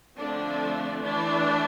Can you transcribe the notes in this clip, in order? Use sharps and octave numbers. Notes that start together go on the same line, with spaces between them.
D3 F3 A3 C4 D4
E3 A3 D4